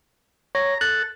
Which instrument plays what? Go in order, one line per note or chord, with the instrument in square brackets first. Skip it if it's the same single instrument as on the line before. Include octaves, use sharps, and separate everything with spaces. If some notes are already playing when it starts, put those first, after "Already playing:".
[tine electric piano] C#5 [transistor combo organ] A#5
[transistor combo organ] A4 [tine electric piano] F#6